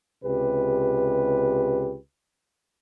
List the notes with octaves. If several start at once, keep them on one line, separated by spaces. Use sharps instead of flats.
C#2 C3 G4 B4